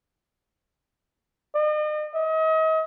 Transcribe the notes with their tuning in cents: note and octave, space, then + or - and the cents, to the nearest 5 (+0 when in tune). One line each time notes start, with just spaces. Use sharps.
D#5 -40
D#5 +40